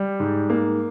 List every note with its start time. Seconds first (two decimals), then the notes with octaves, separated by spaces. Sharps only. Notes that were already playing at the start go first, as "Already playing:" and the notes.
Already playing: G3
0.20 G#2
0.50 A#3